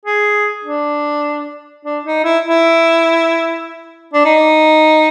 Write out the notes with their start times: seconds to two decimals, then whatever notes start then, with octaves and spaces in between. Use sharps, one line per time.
0.05 G#4
0.64 D4
1.85 D4
2.05 D#4
2.24 E4
2.45 E4
4.14 D4
4.25 D#4